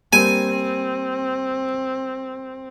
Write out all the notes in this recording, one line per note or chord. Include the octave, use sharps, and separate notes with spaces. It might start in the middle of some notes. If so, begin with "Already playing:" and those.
G3 A#3 C4 G#5